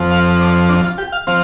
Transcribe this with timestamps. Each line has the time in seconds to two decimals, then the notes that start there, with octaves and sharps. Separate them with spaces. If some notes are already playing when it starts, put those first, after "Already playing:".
Already playing: F2 F3 C4
0.11 F5
0.41 D5
0.69 D4
0.84 F4
0.98 G4
1.12 F5
1.27 F3 C4 F5